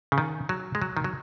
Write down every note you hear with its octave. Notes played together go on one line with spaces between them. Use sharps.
C#3
D#3
F#3
G#3
F#3
D#3
F#3